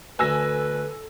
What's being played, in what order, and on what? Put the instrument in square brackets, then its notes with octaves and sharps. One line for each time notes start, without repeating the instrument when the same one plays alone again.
[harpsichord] D2 [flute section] A4 [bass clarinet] B4 [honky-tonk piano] G#5 E6 A#6